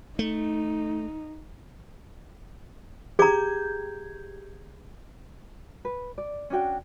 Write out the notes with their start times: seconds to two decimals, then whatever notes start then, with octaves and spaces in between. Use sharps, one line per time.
0.19 A3 D#4
3.19 G4 G#4 A#5 G6 G#6
5.85 B4
6.18 D5
6.50 C#4 D4 F#4 G5